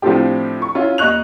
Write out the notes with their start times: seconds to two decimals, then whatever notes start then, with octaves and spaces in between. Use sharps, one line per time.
0.02 A2 F3 C4 D4 F4 G4
0.62 C#6
0.75 C#4 E4 F4
0.98 D#2 D#5 C#6 F#6 F7